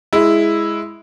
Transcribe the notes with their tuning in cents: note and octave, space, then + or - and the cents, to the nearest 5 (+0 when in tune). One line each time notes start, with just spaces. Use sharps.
G#3 +0 E4 +0